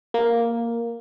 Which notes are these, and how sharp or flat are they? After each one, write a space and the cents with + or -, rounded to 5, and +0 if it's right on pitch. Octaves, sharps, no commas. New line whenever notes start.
A#3 +0